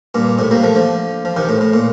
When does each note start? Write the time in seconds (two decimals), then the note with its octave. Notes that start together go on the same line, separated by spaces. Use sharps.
0.15 G2 A#2
0.39 A2 C3
0.51 G3 A#3
0.63 F3 A3
0.75 D3 F3
1.25 F3
1.36 C3 D#3
1.49 A2
1.61 A2
1.74 A#2